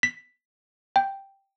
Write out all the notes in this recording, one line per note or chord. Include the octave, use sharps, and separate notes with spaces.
B6
G5